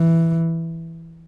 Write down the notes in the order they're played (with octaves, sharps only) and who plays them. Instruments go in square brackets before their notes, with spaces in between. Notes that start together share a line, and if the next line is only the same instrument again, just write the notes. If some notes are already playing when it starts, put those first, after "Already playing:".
Already playing: [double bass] E3